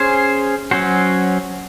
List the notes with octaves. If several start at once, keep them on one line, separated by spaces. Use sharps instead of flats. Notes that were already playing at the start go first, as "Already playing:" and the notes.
Already playing: C#4 G#4 C5
F#3 C#4 F#4 C5